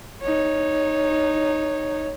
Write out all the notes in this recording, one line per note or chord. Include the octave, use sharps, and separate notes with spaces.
D#4 C#5